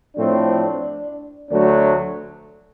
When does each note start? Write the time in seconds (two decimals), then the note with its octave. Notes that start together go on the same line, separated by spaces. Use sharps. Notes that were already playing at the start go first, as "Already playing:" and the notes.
0.16 A2 F3 A3 C4 D4
1.49 D2 D3 F#3 A3 D4